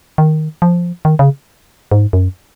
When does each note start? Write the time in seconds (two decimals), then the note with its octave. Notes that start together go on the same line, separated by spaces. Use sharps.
0.18 D#3
0.62 F3
1.05 D#3
1.19 C#3
1.91 G#2
2.13 F#2